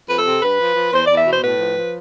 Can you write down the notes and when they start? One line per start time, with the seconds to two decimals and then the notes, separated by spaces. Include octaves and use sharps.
0.09 F2 B4
0.17 A4
0.26 C3
0.42 G2 B4
0.60 F3
0.76 F3
0.93 E2 C5
1.06 E2 D5
1.18 E5
1.26 B2 C5
1.43 A2 B4
1.60 F3
1.77 F3